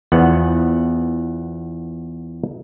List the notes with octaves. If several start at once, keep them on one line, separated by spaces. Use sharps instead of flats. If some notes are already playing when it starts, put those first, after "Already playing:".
E2 F3 B3 F#5